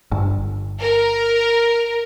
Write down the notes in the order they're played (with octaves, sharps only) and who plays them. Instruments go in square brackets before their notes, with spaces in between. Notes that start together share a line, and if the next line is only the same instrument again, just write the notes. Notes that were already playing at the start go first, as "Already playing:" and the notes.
[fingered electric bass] G1
[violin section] A#4